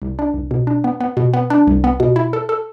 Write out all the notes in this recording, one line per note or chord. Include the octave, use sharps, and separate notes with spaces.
C2
D4
C2
B2
D4
B3
B3
B2
B3
D4
C2
B3
B2
E4
A4
A4